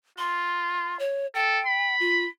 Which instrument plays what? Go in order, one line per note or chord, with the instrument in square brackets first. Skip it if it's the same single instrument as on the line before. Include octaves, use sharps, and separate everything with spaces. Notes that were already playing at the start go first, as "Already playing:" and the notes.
[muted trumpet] F4 [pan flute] C6
[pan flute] C#5
[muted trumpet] A4 [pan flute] G5
[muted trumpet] B5
[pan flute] F4